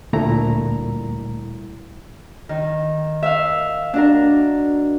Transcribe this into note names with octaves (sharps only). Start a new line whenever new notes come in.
D2 A#2 G3 A3 E4 A#5
D#3
E5 F5
D4 F#4 A#4